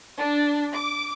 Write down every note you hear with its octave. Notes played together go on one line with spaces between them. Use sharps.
D4
D6